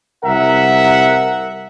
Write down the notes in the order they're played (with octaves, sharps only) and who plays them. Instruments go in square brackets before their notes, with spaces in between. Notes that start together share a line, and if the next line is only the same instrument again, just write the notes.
[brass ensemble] C2 A#4 E5 F#5